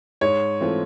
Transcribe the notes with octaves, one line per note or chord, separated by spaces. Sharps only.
G#2 C#5
E3 A3 C4 F4